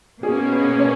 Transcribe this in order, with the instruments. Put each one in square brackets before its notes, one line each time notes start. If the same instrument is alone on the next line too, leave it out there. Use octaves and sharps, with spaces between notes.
[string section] B2 A#3 C#4 [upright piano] G#4
[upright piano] B4
C#5